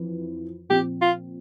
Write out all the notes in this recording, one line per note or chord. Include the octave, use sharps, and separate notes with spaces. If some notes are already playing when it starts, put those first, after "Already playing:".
Already playing: F2 E3
A#2 F3 C4 G4
F4